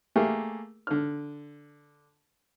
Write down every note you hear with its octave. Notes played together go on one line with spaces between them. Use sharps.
A3 A#3 G4 G#4 A#4
D3 F6